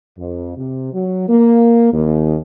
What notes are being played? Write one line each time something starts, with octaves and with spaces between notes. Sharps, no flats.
F2
C3
F#3
A#3
D#2